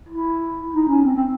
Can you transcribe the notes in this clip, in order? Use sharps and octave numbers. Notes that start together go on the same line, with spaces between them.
E4
D#4
C#4
C4
C4